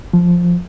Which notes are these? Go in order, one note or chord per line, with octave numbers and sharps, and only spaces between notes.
F3